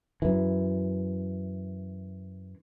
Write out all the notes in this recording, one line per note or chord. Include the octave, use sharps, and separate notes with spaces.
F#2 E3